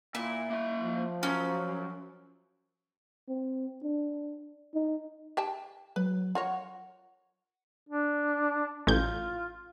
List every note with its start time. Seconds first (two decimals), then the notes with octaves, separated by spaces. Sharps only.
0.15 A#2 E4
0.50 A#3 E5
0.82 F3
1.23 F#2 C#4
3.29 C4
3.84 D4
4.75 D#4
5.37 G4 G5 A5
5.96 F#3 B4
6.35 F4 A#4 C#5 F#5
7.89 D4
8.87 A1 F4 G6